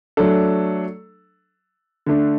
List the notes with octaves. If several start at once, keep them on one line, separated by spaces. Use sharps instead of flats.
F#3 A3 D4 A4
D3 A3 D4